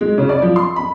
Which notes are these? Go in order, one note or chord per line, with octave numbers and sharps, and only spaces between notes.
G#3
C#3
D5
F3
C6
B5